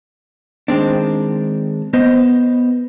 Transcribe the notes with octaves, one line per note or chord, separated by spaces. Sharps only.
D#3 G#3 C4 D4
B3 C5 D#5